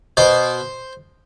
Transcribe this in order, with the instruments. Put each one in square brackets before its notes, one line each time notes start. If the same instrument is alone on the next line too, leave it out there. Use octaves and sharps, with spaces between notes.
[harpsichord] B2 C5